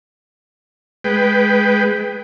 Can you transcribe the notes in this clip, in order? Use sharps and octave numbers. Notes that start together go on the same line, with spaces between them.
G#3 B4 G5